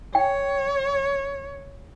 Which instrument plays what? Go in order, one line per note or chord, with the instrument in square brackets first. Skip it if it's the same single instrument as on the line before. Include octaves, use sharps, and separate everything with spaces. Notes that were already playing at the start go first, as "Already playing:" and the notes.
[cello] C#5 [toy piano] G5